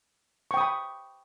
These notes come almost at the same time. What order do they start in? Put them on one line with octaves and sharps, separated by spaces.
C#6 G5 D#6 B5